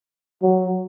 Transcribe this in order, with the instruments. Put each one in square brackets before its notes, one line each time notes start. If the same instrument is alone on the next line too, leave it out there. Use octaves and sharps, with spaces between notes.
[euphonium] F#3